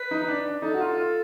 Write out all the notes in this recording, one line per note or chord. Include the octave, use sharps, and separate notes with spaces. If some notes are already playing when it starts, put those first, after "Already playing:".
Already playing: B4
D#4
D#4
D4
D4
D#4 A4
F#4
F4
F4